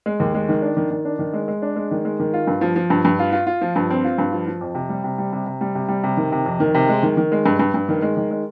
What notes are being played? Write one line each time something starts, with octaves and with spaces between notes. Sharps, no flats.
G#3
D#2
G#3
D#3
D4
D#3
D#3
D4
D#3
G#3
G#3
D4
G#3
D#3
G#3
D#3
F4
G2
F3
F3
G2
G2
F4
F4
F4
F3
G2
C4
F4
G2
F3
F3
F2
C3
G3
C3
G3
C3
C3
G3
C3
G3
C3
D#3
C3
F2
D#3
C3
G#3
D#3
D#3
G#3
G2
G2
G2
D#3
G#3
D#3
G#3